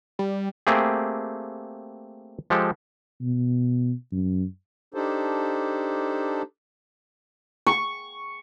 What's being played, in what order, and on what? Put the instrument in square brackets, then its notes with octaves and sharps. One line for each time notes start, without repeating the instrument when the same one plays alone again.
[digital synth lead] G3
[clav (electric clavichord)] A3 A#3 C4 G4 G#4
F3 G#3 G4 A4
[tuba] B2
F#2
[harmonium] D4 D#4 G4 A4 C5
[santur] C#6